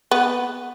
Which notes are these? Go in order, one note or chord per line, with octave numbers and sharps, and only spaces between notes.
B3